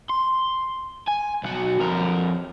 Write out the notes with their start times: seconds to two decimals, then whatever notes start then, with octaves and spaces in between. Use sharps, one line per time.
0.10 C6
1.08 G#5
1.44 B1 F#4
1.80 F2 A#4